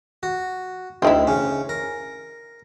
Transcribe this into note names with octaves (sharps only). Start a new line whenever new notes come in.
F#4
D2 C4 D#4 E4
C#3 C#4
A#4